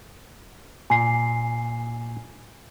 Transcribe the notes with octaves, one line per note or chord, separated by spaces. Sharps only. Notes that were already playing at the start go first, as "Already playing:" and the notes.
A#2 G#5 C7